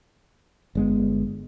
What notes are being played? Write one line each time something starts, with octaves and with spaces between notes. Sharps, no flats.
G1 G#3 B3